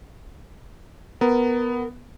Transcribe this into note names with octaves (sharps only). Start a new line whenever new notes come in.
B3 A#4